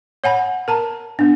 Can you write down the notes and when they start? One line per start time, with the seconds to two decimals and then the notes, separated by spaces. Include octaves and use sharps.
0.24 C#5 F#5 G#5 B5
0.68 A#4 A5 A#5
1.19 B3 D4